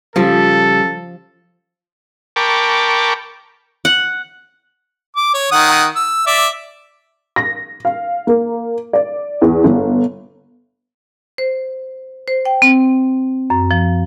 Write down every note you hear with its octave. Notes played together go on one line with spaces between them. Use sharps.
C#3 F3 G3 A4
A#4 G5 A5 B5 C#6 D6
F#5
D6
C#5
D#3 F#5 D#6
E6
D5 E5
A#6
F5
A#3
D5
E2
G1
C5
C5
G5
C4
F#2
F3